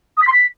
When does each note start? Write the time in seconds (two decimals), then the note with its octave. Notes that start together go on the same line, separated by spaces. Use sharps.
0.17 D#6
0.22 B6
0.27 C6
0.32 B6